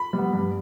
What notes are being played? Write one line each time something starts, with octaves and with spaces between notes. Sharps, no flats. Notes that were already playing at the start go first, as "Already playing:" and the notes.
Already playing: B5
G3
B3
G2